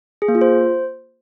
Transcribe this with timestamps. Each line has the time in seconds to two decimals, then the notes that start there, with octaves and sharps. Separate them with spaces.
0.22 G#4
0.28 A#3
0.35 F4
0.41 C5